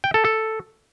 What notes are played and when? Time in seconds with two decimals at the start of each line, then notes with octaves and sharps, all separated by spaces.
0.04 G5
0.14 A4
0.25 A4